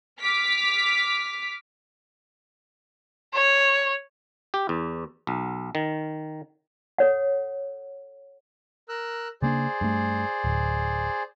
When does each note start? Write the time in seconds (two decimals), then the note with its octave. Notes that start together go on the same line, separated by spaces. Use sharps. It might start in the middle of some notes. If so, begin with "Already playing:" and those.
0.21 D6 F6 B6
3.34 C#5
4.54 G4
4.69 E2
5.27 B1
5.75 D#3
6.98 A4 C#5 F#5
8.89 A#4 E6 F#6
9.42 C#3 A#3 D4 G#4 C5 D5
9.81 G2 A3
10.44 D1